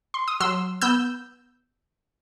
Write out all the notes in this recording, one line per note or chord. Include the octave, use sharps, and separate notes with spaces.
C6
D#6
F#3 C6 E6
B3 E6 G6